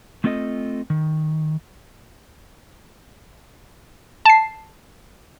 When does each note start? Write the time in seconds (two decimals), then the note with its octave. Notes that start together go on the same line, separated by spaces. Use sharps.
0.24 A3 C4 F4 A4 D5 D#5
0.90 D#3
4.25 A5 C7